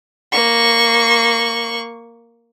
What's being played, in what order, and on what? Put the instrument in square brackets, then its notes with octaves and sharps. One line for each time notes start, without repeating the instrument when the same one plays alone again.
[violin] A#3 C#6